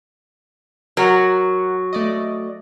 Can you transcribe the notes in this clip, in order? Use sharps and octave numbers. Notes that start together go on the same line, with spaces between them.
F#3 A#4 F#5
A3 D5 D#5